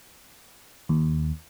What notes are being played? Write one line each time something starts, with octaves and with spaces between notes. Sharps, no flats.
D#2